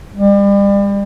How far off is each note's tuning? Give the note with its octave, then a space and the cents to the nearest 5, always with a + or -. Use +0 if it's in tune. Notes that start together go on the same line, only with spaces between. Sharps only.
G3 +35